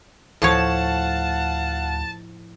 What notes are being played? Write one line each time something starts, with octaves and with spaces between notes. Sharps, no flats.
D2 A2 F3 C#5 F5 F#5 A5